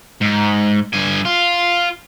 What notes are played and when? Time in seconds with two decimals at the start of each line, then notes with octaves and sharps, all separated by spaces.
0.21 G#2
0.93 G2 G#5
1.25 F4